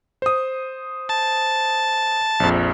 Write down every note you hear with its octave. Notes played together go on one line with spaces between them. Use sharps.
C5 D#6
A5
A#1 F2